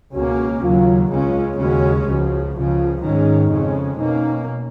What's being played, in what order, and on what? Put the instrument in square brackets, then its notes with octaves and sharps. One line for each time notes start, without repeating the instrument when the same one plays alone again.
[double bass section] C#2 B2 A#3 C#4 [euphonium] F#4
[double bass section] D#2 C#3 F#3 [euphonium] F4
[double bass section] C#2 C#3 G#3 C#4 [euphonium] F4
[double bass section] D#2 C#3 G#3 C#4 [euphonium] F#4
[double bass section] C#2 C#3 F3 [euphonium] F#4
[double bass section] C#2 C#3 F3 [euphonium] F4
[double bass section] G#2 D#3 G#3 C#4 [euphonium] D#4
[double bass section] F2 C#3 G#3 C#4
[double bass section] B2 A#3 C#4 [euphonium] D#4